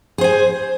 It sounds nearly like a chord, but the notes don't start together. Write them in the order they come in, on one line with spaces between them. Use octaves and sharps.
G#4 C5 G#5